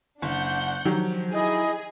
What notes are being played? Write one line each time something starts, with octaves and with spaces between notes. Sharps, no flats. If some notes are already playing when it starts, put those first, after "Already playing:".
F#1 D4 F#5 G6
D#3 F3 F#3 G4
E4 G#4 D#5